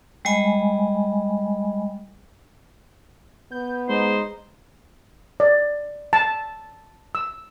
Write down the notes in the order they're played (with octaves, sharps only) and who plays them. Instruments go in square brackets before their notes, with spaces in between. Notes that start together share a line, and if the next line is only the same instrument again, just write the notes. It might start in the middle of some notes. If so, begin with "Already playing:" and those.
[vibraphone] G3 G#3 D#5 G#5 B5
[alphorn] B3 [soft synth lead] G6
[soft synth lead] G#3 [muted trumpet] D#4 [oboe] C5
[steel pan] D5
A5
E6